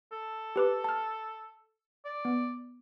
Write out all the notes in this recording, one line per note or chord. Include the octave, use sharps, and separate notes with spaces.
A4
G4 B4 D6
A5 F6
D5
B3